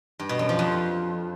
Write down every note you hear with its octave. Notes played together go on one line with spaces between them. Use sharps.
G2
B2
F#2
F3
F2